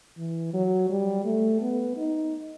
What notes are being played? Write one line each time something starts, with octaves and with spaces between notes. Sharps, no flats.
E3
F#3
G3
A3
B3
D#4